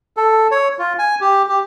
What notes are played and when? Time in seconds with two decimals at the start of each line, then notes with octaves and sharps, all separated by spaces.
0.17 A4
0.51 C#5
0.79 F4
0.99 G#5
1.21 G4
1.49 G4